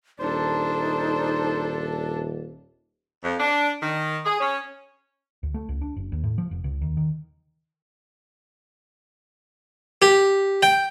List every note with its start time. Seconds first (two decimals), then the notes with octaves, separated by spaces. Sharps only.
0.20 D#1 D4 D#4 A4 C5
3.24 F2
3.40 D4
3.82 D#3
4.26 G#4
4.40 C#4
5.43 D2
5.54 A3
5.69 C#2
5.82 D4
5.96 F#1
6.12 D#2
6.24 A2
6.38 F3
6.51 F1
6.64 C#2
6.81 D#2
6.97 D#3
10.02 G4
10.63 G5